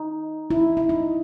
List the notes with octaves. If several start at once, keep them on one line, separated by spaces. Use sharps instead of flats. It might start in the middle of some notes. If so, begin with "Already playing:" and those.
Already playing: D#4
E4
E4
D#4